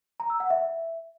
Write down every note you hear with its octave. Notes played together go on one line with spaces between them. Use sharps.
A#5
E6
F#5
E5